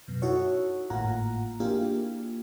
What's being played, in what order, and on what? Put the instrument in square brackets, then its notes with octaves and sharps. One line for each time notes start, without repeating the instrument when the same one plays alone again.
[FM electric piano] F#2 B2
D#4 E4 F#4 A4 C#5
G#1 A2 A#3 F4 F#5 A#5
A#3 D4 E4 F4 G4 G#4